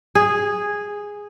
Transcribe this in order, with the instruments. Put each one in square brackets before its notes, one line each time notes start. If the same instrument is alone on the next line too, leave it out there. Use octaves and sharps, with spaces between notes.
[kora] G#4